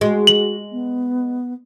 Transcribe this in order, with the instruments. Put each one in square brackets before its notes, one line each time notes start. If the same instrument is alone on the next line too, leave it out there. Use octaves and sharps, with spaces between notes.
[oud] G#3 [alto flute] F#4
[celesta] F#7
[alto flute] B3